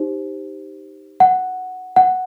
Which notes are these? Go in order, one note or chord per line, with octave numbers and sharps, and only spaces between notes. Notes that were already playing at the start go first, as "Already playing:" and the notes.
Already playing: D#4 G4 C5
F#5
F#5